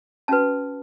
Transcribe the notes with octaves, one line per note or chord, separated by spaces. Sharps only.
C#4 F#4 B4 A5